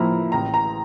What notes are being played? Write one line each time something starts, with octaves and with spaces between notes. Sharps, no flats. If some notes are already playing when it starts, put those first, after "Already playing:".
Already playing: A2 F3 A#3 E4 A#5
A1 A#5
A#5